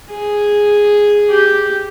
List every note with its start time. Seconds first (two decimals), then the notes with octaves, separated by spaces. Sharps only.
0.11 G#4
1.30 G4